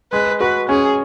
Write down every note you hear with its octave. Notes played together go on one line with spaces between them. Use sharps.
G#3 B4
F#4 B4
C#4 G#4